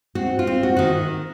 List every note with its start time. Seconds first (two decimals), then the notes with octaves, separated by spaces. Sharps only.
0.15 C4 F#4
0.39 F4
0.47 C4
0.63 F#4
0.77 D#3 F#4